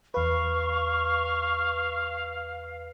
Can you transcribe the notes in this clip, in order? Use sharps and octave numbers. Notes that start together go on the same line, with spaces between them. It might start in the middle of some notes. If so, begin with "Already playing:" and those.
E2 B4 F5 C#6